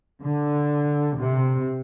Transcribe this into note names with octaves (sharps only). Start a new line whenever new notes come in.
D3
C3